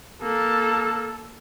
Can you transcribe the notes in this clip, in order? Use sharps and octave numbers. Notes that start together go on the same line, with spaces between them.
A#3 A4